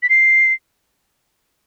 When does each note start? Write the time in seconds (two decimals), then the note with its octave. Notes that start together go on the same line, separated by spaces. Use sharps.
0.03 B6
0.10 C7